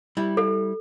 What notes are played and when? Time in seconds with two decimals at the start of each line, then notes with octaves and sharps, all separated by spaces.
0.17 G3 E4
0.37 A4